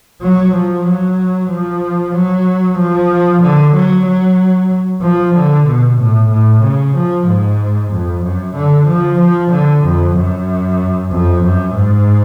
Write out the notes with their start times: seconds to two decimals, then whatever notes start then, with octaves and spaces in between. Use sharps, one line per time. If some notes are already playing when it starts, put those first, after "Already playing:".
0.22 F#3
0.54 F3
0.87 F#3
1.51 F3
2.15 F#3
2.78 F3
3.42 D3
3.74 F#3
4.06 F#3
5.02 F3
5.35 D3
5.67 B2
5.99 A2
6.30 A2
6.62 C#3
6.95 F3
7.27 G#2
7.91 F2
8.24 F#2
8.55 D3
8.87 F3
9.19 F3
9.51 D3
9.84 F2
10.16 F#2
11.11 F2
11.43 F#2
11.75 G#2